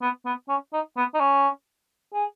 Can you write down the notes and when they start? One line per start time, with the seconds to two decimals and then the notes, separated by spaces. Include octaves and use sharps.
0.02 B3
0.26 B3
0.49 C#4
0.73 D#4
0.97 B3
1.14 D#4
1.20 C#4
2.14 G#4